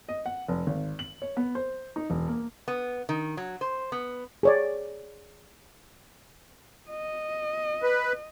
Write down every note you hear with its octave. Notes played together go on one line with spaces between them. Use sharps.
D#5
F#5
F1
G#1
F#7
C#5
B3
C5
D#4
E1
A#3
B3
D#3
F#3
C5
B3
G#4 C#5 D5
D#5
B4